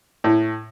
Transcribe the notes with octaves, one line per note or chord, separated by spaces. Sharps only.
A2